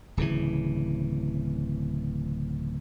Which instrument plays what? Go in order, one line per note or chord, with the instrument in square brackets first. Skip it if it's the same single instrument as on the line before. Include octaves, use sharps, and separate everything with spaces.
[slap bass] D1 C#3 E3